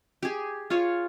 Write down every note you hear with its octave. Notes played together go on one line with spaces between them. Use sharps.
G4 G#4
F4 G#4 C#5